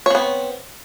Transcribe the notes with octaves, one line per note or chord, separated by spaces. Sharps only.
B3 C4 C#5